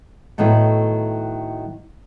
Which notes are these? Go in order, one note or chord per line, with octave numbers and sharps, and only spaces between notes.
A2 D#3 F#3 A3 B3 E4